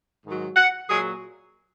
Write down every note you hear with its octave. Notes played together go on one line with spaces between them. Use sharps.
G#2 D#3 F#3
F#5
A#2 F#3 G#4